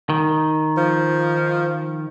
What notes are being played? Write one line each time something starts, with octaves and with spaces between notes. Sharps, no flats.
D#3
F3